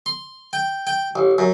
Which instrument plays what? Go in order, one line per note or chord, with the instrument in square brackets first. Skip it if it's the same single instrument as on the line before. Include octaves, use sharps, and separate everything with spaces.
[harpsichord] C6
G5
G5
A1
F#2